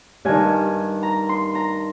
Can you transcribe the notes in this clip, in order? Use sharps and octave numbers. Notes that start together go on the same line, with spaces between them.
G2 D#3 G#5
A#5
C6
A#5